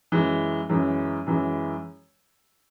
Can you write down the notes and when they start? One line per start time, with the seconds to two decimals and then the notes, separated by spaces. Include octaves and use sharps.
0.12 F#2 E3 G#3
0.69 F#2 E3 G#3
1.26 F#2 E3 G#3